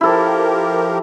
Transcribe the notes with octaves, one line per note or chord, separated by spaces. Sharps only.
F3 E4 G4 A4 A#4